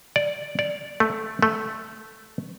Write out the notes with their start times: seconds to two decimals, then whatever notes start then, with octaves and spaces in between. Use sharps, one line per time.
0.16 D5
0.59 D5
1.00 A3
1.42 A3